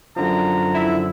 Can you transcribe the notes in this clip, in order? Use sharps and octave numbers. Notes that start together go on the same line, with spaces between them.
F#2 D3 F3 A#5
E4